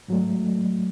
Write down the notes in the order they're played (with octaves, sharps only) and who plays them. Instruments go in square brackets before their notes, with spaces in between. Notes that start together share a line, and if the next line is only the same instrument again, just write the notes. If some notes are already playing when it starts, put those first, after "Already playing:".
[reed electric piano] G#2 F#3 A3